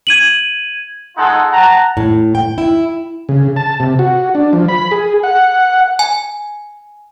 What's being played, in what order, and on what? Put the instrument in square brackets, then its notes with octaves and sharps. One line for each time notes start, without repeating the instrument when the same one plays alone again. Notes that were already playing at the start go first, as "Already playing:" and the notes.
[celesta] G#6 D#7 F#7
[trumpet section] G#3 D#4 F4 A4 F#5
F#5 A5 A#5
[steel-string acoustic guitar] A2
G5
E4
[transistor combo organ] C#3
A5
C3
F#4
D4
F3
B5
G#4
F#5
[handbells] G#5